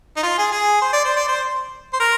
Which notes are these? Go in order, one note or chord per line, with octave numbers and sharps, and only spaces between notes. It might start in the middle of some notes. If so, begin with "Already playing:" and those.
D#4
F4
G#4
G#4
C5
D5
C5
D5
C5
C5
A#4